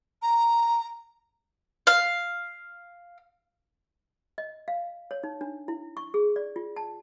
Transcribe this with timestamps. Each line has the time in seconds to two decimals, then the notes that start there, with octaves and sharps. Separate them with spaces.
0.22 A#5
1.87 F5
4.38 D#5
4.68 F5
5.11 C#5
5.24 D#4
5.41 D4
5.68 E4
5.97 C#6
6.14 G#4
6.36 D5
6.56 F4
6.76 A5